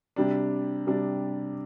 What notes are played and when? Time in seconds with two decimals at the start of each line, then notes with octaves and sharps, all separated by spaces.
0.16 C3 G3 D4
0.87 C3 G3 D4